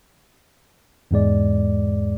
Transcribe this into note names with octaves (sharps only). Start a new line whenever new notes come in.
E2 G#2 G#3 D5